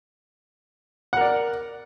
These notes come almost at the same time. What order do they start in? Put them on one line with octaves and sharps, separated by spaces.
F#5 A#4 D5